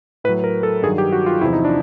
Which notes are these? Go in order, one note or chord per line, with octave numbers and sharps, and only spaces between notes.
A2 F#3 B4
A#4
A4
G2 D#3 F#3 G#4
G4
F#4
F4
E2 C3 F3 E4
D#4
D4